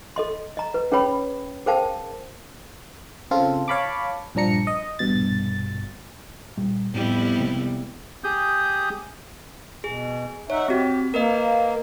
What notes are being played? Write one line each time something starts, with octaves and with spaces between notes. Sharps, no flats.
A4 D#5 C6
D#5 A#5
B4
C#4 G#4 B4 C#5 G5 B5
G#4 A#4 C5 F5 G5 A5
C#3 C4 F4 A4
C#5 F5 A5 B5 C#6 D6
A#1 G2 F3 D4 A#5 C#7
D#5
A#1 G2 B2 A6
A#2 G3
F2 A2 G3 B3 E4
C3 G#3 A#3
G4 G#4 D#6 G6
B2 G#4
D#4 C#5 E5 F#5
C4 F#4 G4
A#3 A#4 B4 D#5